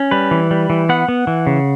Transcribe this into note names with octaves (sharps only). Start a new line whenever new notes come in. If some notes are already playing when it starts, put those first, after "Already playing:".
Already playing: C#4
G3 B4
E3
G3
E3
B3 F#5
B3
E3
C#3